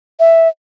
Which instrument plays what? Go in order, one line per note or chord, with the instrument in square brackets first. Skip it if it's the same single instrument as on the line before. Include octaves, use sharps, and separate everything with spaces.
[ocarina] E5